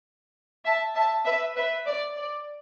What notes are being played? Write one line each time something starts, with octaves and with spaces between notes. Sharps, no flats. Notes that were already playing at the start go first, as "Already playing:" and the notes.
E5 A5
E5 A5
B4 E5
B4 E5
D5
D5